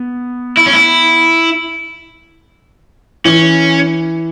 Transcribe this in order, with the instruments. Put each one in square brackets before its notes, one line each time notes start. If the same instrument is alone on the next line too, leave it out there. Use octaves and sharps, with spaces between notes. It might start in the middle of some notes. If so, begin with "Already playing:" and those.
Already playing: [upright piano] B3
[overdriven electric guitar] E4
C#4
E4
[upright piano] E3 [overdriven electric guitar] C#4